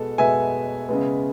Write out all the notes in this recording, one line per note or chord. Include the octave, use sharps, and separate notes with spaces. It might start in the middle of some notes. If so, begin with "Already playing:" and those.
Already playing: B2 G#3 B3 A4
B2 G#3 B3 E5 G#5
C#3 G#3 B3